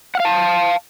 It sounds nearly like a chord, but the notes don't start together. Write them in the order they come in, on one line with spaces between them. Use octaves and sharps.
F#5 F5 A5